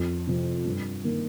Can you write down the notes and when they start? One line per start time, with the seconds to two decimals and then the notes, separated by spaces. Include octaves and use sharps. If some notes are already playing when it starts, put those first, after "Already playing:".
Already playing: F2
0.27 C3 F3 C4
0.65 G2
1.03 D#3 A#3